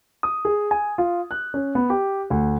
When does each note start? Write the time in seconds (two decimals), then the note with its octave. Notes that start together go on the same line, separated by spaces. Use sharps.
0.23 D#6
0.45 G#4
0.71 G#5
0.98 F4
1.31 F#6
1.54 C#4
1.75 B3
1.90 G4
2.30 D2